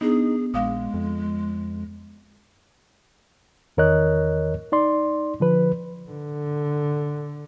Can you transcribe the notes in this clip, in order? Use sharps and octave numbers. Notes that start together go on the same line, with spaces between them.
B3 D4 D#4 G#4
A#1 G#3 F5 D6 D#6
F2
E2 D#3 A#4 C#5 D#5 F#6
D#4 D5 C6
D3 F3 B4
D3